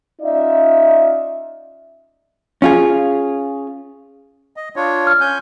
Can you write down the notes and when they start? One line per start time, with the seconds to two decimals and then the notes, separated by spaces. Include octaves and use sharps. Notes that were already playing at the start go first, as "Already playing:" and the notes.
0.22 C#4 D#4 F4 D5 E5
2.62 C#4 F4 G#4
4.57 D#5
4.76 D4 F4 C#5
5.07 F6
5.21 C#4 G#5 G6